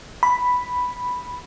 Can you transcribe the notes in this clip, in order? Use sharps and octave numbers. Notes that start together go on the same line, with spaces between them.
B5